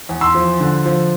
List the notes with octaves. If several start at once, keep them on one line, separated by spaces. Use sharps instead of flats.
E2
C6 E6
F3
D3
F3